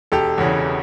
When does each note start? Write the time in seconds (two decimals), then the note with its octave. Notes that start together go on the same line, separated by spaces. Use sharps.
0.12 E1 G4 A4
0.38 E2 C#3 E3